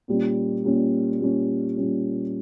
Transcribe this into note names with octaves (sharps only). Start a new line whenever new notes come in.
A#2 G3 C#4
A#2 G3 C#4
A#2 G3 C#4
A#2 G3 C#4